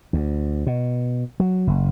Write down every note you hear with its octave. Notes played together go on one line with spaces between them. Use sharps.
D2
B2
F#3
F#1